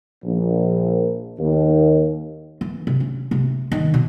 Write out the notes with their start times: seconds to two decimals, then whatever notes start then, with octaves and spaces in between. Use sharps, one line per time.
0.23 A#1
1.39 D#2
2.61 E3
2.87 C3
3.00 C#4
3.31 C3
3.72 D#3
3.94 B2